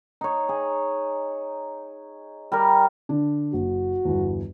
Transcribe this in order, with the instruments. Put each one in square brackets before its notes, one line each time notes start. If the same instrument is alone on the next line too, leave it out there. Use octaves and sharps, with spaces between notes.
[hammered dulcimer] D#4 C#5
G#4
G3 A#4
[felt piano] D3 D4
[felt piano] F#1 [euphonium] F#4
[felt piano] G1 E2